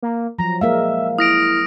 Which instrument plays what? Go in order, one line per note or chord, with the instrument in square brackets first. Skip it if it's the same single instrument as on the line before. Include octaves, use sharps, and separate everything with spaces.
[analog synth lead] A#3
[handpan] F3 F#3 [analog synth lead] A#5
[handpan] G#3 A#3 A#4 [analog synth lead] E5 [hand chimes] F5
[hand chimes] E4 [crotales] D#6 A#6 D7 [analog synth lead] F6